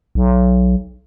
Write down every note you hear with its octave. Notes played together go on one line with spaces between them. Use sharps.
B1